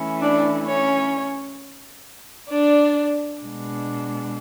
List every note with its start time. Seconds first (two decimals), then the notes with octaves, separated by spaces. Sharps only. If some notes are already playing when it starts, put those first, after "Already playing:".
Already playing: E3 A3 C#4 E4
0.22 D4 D5
0.67 C#4 C#5
2.49 D4 D5
3.39 B2 G#3 D4